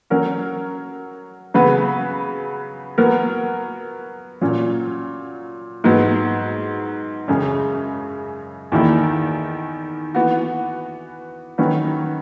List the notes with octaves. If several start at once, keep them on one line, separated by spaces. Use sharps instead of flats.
F#3 C#4 F#4 A#4
C#3 F#3 B3 F#4 B4
F#3 B3 F#4 A#4
A#2 F#3 C#4
G#2 F#3 B3
F#2 C#3 G#3 C#4
E2 D#3 A#3 E4
E3 B3 F#4
D#3 F#3 C#4 F#4 B4